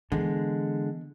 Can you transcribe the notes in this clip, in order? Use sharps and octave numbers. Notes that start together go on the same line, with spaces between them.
D3 E3 G#3 B3